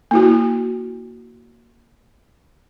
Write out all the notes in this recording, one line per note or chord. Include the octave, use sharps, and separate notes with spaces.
A#3 E4 F#4